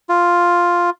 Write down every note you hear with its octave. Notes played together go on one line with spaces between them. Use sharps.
F4